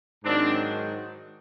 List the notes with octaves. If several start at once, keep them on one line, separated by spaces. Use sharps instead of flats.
G#2 D#3 F#3 C4 D4